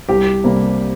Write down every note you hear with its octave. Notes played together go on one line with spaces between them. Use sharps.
C2 G4
C3 G3 A#3